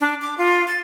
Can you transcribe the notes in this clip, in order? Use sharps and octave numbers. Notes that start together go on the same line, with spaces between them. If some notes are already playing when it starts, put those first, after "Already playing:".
D4
D6
F4
A6